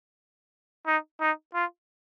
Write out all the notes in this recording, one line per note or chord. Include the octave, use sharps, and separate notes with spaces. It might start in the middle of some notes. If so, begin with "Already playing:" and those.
D#4
D#4
F4